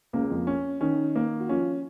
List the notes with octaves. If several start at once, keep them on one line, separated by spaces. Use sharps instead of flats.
C#2 C#3 A#3
F2 F3
C#4
D#3 C#4 D#4
A#3
F#4
F3 C#4 F4